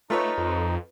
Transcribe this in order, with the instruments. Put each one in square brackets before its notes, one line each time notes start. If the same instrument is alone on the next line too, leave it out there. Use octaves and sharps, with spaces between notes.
[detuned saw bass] A3 [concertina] D#4 [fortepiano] F4 B4 C#5
[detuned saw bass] F2